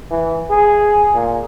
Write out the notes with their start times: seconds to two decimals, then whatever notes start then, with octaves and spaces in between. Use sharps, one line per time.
0.11 E3
0.50 G#4
1.14 A#2